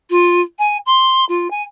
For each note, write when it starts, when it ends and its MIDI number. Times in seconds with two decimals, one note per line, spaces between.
0.10 0.41 65
0.59 0.78 80
0.86 1.25 84
1.29 1.50 65
1.51 1.63 80